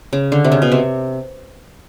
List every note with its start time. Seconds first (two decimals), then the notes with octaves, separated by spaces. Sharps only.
0.13 C#3
0.32 D3
0.44 C3
0.52 C#3
0.62 B2
0.72 C3